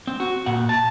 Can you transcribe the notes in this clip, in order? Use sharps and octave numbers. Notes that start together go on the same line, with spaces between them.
C4
F#4
A#2 F#5
A5